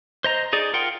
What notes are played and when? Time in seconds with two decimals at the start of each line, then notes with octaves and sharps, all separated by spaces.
0.24 C5 D#5 A#5
0.53 D#4 G#4 D5
0.73 F4 A#4 F#5 G5 C6